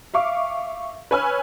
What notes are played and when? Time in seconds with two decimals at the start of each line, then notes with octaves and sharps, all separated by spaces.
0.14 E5 F5 C#6 D6
1.11 B4 C#5 G#5 E6 F6